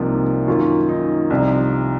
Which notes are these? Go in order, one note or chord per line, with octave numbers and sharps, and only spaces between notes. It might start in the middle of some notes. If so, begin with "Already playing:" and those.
Already playing: C2 C3 F3 A#3 D#4
F#2 D#3 A#3 C#4 F4
D#4
C2 C3 F3